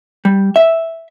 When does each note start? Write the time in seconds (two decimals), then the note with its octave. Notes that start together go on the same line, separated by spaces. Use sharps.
0.25 G3
0.56 E5